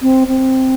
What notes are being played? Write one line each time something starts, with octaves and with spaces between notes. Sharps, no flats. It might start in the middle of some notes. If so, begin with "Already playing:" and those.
C4
C4